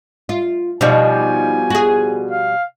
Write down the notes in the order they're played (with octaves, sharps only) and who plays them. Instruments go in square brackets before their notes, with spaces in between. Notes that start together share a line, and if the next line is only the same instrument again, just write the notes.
[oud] F4
[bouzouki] B2 F3 G3 [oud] D#4 [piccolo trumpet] G#5
[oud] F#4 G#4
[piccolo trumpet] F5